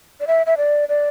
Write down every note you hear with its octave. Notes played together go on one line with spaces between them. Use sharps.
D5
E5
E5
D5
D5